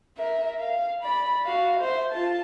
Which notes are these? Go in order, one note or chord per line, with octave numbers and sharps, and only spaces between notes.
A#4 E5
F5
D5 B5
F#4 F5
C5 E5
F4 A5